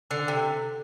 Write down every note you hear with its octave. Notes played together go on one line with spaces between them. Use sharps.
D3
C3